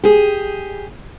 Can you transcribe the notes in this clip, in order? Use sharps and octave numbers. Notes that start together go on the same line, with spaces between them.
G4 G#4